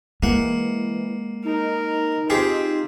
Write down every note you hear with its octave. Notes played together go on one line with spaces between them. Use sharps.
E3 G#3 A#3 F#5
D#4 A#4
C4 F4 G4 G#4